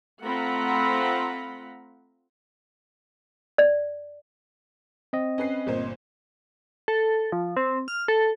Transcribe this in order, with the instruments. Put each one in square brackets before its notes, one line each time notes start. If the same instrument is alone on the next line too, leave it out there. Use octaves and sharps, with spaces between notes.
[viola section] A3 C4 F4 F#5 A#5 B5
[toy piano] D5
[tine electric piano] C4 D#5
[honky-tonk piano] C#4 B4 C7
G1 A#2 C5
[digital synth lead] A4
F3
C4
F6
A4